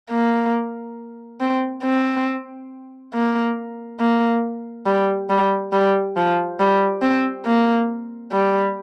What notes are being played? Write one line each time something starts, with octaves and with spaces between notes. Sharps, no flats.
A#3
C4
C4
A#3
A#3
G3
G3
G3
F3
G3
C4
A#3
G3